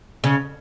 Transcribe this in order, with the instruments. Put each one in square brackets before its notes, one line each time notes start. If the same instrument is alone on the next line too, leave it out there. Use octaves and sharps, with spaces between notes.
[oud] C#3